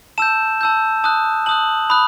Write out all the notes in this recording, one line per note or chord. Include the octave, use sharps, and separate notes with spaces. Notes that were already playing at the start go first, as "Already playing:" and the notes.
A5 E6 G6 E7
A5 E6 G6
A5 D#6 F#6
A5 D#6 F#6 F#7
B5 D#6 F#6